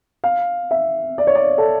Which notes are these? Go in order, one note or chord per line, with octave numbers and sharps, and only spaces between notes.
F5
E5
D5
C#5
D5
A4